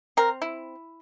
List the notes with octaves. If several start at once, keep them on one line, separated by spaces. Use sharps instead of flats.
C4 A#4
E4